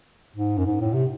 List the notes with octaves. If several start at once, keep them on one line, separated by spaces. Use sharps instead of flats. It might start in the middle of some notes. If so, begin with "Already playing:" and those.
G#2
F#2
G#2
A2
C3